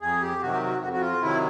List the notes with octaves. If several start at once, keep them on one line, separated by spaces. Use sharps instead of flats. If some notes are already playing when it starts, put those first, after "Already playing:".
F2 G#4
G4
C3 D#3 F#3 F#4
G4
F#4
F2 F#4
F#4
F4
C3 D#3 F#3 E4